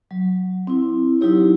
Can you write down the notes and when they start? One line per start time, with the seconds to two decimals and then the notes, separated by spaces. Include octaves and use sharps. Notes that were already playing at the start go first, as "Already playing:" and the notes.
0.11 F#3
0.67 C4 E4
1.21 F#3 D#4 E4 G4 C#5